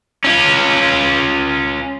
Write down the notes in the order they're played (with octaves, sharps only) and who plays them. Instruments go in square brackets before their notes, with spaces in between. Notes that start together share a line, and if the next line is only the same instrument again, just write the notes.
[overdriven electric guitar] C#4 F4